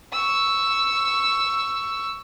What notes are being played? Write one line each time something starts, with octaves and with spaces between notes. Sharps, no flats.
C#6 E6